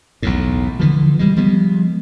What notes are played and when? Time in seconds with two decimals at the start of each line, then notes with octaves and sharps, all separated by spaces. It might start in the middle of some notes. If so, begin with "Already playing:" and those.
0.23 B1 E2 A2
0.80 D3 E3 F3
1.19 E3 G3 G#3
1.36 F3 G3 G#3 B3